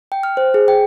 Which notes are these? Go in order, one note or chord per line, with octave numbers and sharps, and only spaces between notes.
G5
F6
C5
G#4
G5